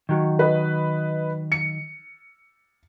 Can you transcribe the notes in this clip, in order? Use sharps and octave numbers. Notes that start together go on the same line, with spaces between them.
D#3 F#3
B4 D#5
C#7